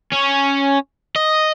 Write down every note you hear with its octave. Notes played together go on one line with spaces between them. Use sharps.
C#4
D#5